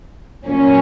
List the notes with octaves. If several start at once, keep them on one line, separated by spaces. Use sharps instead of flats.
A#2 F#3 A#3 C#4